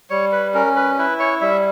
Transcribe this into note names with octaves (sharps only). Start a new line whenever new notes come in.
G3 C#5
B4
C#4 A#4
B4
E4 B4
C#5
G3 E5